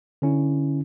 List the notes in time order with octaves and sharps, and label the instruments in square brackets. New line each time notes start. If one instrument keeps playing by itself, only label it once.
[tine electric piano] D3 C#4 E4